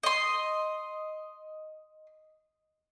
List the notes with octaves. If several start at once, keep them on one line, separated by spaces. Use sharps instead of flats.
D#5 C6